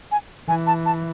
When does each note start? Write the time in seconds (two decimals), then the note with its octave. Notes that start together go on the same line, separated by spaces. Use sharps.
0.11 G#5
0.48 E3 G#5
0.67 A5
0.85 A5